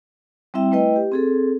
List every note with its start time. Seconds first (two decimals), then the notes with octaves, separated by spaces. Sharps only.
0.54 G3 C4 E4 E5 G5
0.72 A3 E4 B4 D#5 G5
0.96 G4
1.12 C4 G#4 A4